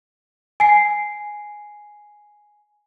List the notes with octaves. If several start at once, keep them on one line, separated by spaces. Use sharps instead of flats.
G#5 C7